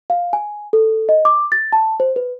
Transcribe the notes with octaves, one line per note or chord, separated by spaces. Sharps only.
F5
G#5
A4
D#5
D6
A6
A5
C5
B4